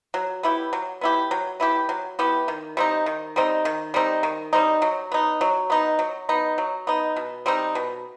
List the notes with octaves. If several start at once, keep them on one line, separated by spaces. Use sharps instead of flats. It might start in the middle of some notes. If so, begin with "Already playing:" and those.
F#3
B3 E4 G4
F#3
B3 E4 G4
F#3
B3 E4 G4
F#3
B3 E4 G4
D#3
G3 C4 D#4
D#3
G3 C4 D#4
D#3
G3 C4 D#4
D#3
G3 C4 D#4
F#3
B3 D#4
F#3
B3 D#4
F#3
B3 D#4
F#3
B3 D#4
B2
G3 C4 D#4
B2